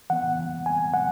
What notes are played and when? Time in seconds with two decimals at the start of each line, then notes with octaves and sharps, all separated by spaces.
0.10 E3 B3 F#5
0.66 G#5
0.94 F#5